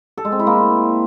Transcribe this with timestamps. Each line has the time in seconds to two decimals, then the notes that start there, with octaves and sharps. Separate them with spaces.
0.18 A4
0.25 G#3
0.32 C4
0.39 E4
0.47 A#3